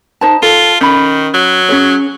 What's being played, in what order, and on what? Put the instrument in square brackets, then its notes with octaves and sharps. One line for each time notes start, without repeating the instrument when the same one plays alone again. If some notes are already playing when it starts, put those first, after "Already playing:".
[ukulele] D#4 C5 A5
[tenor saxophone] F4 [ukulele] A4
[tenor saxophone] D#3 [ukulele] C#4 B5
[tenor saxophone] F#3
[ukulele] C#4 G#4 C#5